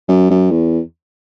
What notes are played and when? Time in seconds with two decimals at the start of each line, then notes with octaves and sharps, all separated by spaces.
0.09 F#2
0.30 F#2
0.51 E2